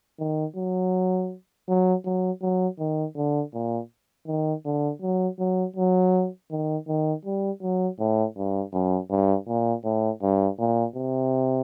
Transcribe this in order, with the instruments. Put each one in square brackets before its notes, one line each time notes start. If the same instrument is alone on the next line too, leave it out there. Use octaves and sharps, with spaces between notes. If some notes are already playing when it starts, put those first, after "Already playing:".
[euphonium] D#3
F#3
F#3
F#3
F#3
D#3
D3
A#2
D#3
D3
F#3
F#3
F#3
D#3
D#3
G3
F#3
A2
G2
F#2
G2
A#2
A2
G2
A#2
C3